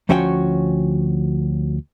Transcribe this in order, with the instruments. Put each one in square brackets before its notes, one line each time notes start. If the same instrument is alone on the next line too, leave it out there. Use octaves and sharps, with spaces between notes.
[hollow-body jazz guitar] D2 F3 C#4 F#4 C#5 G5